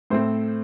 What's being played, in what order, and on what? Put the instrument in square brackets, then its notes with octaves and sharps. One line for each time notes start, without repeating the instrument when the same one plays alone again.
[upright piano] A2 A3 C4 C5